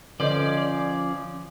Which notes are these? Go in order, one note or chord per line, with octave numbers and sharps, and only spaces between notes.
D3 F3 C#4 A4 C5 D5 D#5